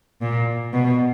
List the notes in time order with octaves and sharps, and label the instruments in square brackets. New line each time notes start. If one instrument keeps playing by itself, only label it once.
[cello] A#2
B2